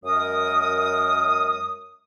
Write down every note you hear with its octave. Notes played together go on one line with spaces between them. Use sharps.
F#2 G#3 A#4 D#6